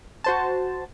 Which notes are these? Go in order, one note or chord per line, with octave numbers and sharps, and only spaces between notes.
F#4 C5 A5